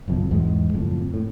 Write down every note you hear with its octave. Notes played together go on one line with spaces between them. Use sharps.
F#1 B1 F2
E2 G#2 G#3
F#1 F2 A2
A2